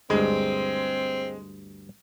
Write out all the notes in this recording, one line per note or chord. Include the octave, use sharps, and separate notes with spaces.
D2 G2 G#3 C4